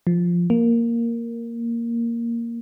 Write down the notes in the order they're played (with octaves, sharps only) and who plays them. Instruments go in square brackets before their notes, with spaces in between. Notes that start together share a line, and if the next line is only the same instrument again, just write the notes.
[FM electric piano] F3
A#3